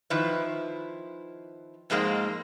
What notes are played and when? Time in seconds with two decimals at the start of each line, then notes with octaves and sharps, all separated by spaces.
0.10 D#3 F3 E4 B4
1.90 F2 G#2 G#3 A#3 C4